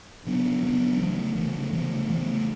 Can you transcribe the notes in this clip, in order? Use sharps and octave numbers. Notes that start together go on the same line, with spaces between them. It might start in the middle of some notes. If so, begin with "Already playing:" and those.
C#3 F#3 B3 D4
C#3 F#3 B3 D4
C#3 E3 A3
C#3 E3 A3
C#3 E3 A3
C#3 E3 A3